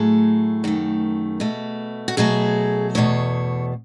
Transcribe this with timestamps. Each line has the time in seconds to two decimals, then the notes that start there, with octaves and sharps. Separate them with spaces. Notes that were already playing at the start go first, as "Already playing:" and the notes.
Already playing: A2 F#3 A3 G#4
0.64 F#2 D#3 A3
1.40 B2 A3
2.08 F#4
2.17 B2 F#3 A3 G#4
2.95 E2 B2 A3 C#5